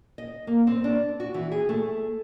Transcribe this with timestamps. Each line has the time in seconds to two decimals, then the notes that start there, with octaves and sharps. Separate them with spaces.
0.18 D#5
0.47 A#3
0.67 C4
0.84 D4
1.20 F#4
1.34 E3
1.52 G#4
1.69 A3